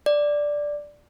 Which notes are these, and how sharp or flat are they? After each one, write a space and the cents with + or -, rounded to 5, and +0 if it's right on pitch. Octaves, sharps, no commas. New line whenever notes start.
D5 +0